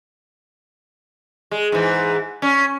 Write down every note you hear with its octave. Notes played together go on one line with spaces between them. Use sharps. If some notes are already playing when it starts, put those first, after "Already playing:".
G#3
G#2 E3
C#4